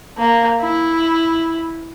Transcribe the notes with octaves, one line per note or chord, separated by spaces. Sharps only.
A#3
E4